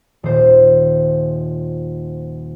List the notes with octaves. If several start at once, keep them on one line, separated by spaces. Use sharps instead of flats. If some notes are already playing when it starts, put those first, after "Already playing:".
D#1 C5